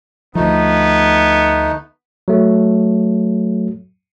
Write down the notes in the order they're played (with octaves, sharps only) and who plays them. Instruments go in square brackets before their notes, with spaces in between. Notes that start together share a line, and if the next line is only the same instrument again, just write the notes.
[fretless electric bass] D2 F3 [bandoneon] A3 D#4 [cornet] B3
[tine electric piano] F#3 A3